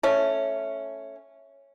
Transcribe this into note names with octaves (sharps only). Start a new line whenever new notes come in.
A3 C#4